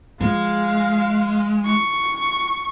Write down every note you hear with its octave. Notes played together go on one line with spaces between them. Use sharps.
F3 G#3 F5
C#6